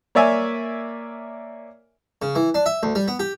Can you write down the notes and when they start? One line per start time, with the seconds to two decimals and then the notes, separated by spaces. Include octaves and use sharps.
0.15 A#3 C#5 D5 E5 G#5
2.22 C#3
2.35 E3
2.55 D4
2.66 E5
2.83 D2
2.95 G3
3.08 B3
3.19 G4